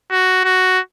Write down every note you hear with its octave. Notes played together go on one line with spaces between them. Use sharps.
F#4
F#4